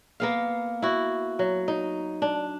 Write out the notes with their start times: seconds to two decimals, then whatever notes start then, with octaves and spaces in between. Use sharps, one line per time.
0.20 A#3 B3 F5
0.82 E4 F#4
1.39 F#3
1.68 D#4
2.22 D4